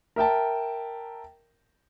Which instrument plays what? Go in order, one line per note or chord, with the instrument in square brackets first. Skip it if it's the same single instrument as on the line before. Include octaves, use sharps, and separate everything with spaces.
[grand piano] A#4 E5 G5 A5